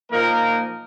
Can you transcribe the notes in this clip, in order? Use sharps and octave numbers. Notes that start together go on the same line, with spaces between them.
A#2 F3 A#3 D#4 A#4